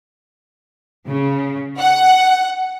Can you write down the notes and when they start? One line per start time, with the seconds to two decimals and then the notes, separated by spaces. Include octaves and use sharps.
1.08 C#3
1.79 F#5